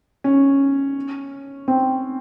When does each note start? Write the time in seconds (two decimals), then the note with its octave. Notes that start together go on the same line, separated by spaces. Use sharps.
0.24 C#4
1.68 C4